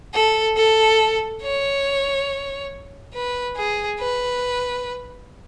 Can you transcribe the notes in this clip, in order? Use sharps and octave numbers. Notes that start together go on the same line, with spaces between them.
A4
A4
C#5
B4
G#4
B4